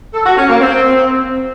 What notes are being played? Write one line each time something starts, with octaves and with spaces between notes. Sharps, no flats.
A4
F#4
C#4
A#3
C4